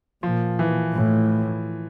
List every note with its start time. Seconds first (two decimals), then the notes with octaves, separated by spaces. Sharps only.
0.23 A#2 F3
0.59 E3
0.93 A2